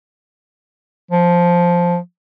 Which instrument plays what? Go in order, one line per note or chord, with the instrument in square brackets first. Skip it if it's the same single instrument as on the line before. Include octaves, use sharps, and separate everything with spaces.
[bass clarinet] F3